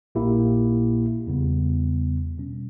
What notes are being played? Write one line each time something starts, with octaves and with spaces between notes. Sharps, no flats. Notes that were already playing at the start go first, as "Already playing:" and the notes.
A#1 A#2 A#3 E4 G4
E2 C#3 G3 B3
B2 G3 C#4